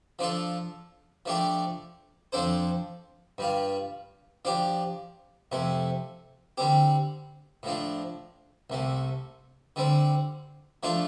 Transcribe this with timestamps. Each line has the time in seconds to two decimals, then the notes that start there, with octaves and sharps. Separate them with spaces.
0.19 F3 D4 F4 A4
1.26 F3 A3 D4 G4 D5
2.32 F2 F3 D4 A4 C5
3.38 G2 G3 F4
4.45 F3 D4 G4
5.52 F2 C3 A3
6.58 D3 G3 C4 G4
7.63 A2 F3 D4
8.70 C2 C3 A3
9.76 D3 G3 C4
10.83 F3 A3 D4 F4